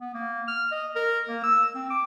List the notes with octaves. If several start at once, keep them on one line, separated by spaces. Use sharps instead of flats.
B3
A#3
F6
D#5
A#4
A#3
E6
C4
D6